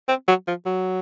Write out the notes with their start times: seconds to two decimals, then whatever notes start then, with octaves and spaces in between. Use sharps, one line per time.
0.08 C4
0.28 F#3
0.48 F3
0.66 F#3